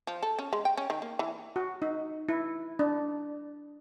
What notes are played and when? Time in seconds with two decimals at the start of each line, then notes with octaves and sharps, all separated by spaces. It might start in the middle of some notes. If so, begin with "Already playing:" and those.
0.07 F3
0.23 A4
0.39 C#4
0.53 G#3
0.65 G5
0.77 C#4
0.90 D#3
1.02 A#3
1.19 E3
1.56 F#4
1.82 D#4
2.29 E4
2.79 D4